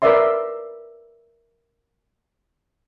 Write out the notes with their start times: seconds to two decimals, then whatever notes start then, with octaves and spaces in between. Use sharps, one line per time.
0.02 A#4 B4 D5 E5 C6